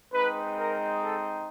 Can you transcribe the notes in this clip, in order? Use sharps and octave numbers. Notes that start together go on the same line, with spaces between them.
G#3 C4 D#4 B4
A#4
A4